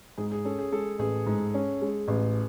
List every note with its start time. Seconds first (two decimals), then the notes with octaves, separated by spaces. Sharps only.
0.17 G#2 G#4
0.32 G#4
0.45 C#4 A4
0.59 G#4
0.72 G#3 A4
0.99 A1 G#4
1.26 G#2
1.54 C#4
1.82 G#3
2.08 A1